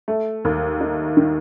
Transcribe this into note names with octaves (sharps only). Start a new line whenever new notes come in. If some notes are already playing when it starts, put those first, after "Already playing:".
A3
D#2
D#4
D#3